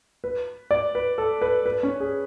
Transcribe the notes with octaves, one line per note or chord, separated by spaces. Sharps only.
B4
D5
B4
A4
B4
B4
C#4
G#4